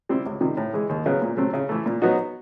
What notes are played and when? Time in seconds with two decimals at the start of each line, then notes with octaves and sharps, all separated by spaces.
0.09 G3 C4 E4
0.26 C#2
0.41 C3 D#3 G3
0.57 A2
0.74 E3 G#3
0.89 D#2
1.06 C#3 F#3 B3
1.22 A#2
1.37 F#3 A3 C4
1.53 C#3
1.69 E3 A3
1.86 A#2
2.02 F#3 B3 D#4 F#4